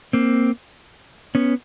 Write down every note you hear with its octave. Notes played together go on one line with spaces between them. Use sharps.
A#3 C4
B3 C#4